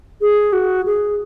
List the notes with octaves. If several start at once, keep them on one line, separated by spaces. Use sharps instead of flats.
G#4
F#4
G#4